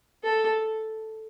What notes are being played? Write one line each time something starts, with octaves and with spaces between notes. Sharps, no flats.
A4